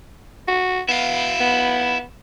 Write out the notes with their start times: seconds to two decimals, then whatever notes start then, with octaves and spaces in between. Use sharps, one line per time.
0.48 F#4
0.89 B3 E4 F5
1.40 B3